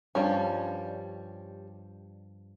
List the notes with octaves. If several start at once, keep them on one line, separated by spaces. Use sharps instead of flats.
G2 F3 G3 C#4